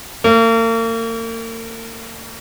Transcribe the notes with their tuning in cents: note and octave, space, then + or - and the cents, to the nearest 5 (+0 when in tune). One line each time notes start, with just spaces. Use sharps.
A#3 -40